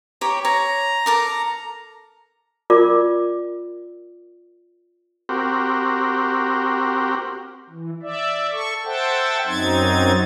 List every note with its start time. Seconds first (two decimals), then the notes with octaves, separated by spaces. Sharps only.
0.21 G4 C#5 A#5
0.45 C#5 A#5
1.06 A4 A#4 D6
2.70 F4 A#4 D5 D6
5.29 C4 F#4 G4 A#4
7.70 E3
8.02 D5 E5
8.52 A4 C#6
8.85 A4 C5 E5 F#5 G5 A5
9.47 F#2 F#3 C4 D#4 G#6 A6